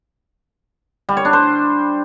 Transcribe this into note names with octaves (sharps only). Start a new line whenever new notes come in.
G3
C#5
D4
C5